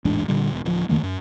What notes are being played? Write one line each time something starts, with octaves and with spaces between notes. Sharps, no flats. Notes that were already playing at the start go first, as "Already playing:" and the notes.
A1 E2 G#2 D4
A#2 D3 G3
E1
D1 F3
F2 D#3 A3 A#3
F#2